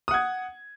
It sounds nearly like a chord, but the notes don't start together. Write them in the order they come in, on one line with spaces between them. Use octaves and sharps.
D#6 F#5 G#6